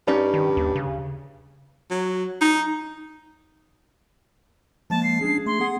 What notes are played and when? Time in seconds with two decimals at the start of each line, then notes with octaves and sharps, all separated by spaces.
0.08 G2 C#4 D#4 D5
0.34 D#3
0.57 D#2
0.76 C#3
1.90 F#3
2.41 D#4
4.90 F3 G#3 A#3 A5
5.03 C7
5.21 C#4 D4 G#4
5.46 A3 C6
5.60 B3 G#4 F#5